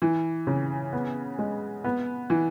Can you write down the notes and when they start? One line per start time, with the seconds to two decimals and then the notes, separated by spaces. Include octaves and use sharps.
0.02 E3
0.47 C#3
0.93 B3
1.39 G#3
1.84 B3
2.30 E3